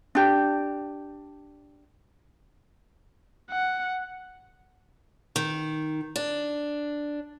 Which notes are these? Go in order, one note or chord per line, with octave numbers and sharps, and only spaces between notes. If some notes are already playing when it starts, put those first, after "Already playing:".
D4 G4
F#5
D#3
D4